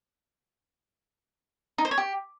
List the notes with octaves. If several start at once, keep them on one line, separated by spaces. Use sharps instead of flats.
D#4
C5
C#5
G4